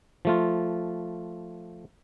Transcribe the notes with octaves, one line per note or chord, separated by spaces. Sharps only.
F3 A3 F4